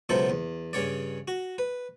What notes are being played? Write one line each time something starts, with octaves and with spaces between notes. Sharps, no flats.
C#2 B2 F#3 E4 A4 C5
E2
G2 C#3 C#5 D5
F#4
B4